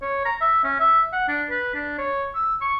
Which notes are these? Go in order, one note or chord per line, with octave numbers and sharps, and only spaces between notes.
C#5
A#5
E5
C#4
E5
F#5
D4
B4
D4
C#5
E6
C#6